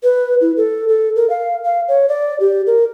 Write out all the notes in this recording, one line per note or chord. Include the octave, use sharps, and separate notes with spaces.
B4
E4
A4
A4
A#4
F5
F5
C#5
D5
G4
A#4